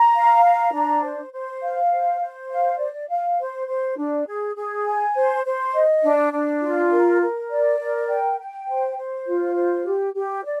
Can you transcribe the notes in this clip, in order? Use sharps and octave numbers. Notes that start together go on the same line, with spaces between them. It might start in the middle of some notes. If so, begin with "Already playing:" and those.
Already playing: A#5
F5
A#5
D4
C5
C5
F5
C5
C5
F5
D5
F5
C5
C5
D4
G#4
G#4
G#5
C5
C5
D#5
D4
D4
F4
A#4
A#4
D5
A#4
G5
G5
C5
C5
F4
C5
G4
G4
D5